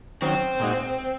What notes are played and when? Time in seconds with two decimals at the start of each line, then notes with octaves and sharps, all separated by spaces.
0.22 D#3 F#3 C4 C#4
0.60 A#2 G#3 D#4 F#4